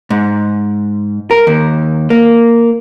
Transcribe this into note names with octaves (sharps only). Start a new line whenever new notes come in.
G#2
A#4
D#2
A#3